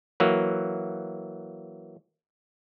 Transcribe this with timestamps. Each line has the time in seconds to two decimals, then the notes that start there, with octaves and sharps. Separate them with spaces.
0.20 E3 F#3 A#3